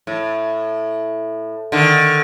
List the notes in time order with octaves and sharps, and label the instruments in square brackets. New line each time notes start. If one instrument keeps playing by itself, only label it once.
[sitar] A2
D3 D#3